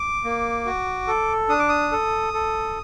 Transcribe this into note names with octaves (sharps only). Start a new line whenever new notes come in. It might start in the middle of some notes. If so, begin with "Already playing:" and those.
Already playing: D6
A#3
F#4
A4
D4 D#6
D6
D#6
A4
A4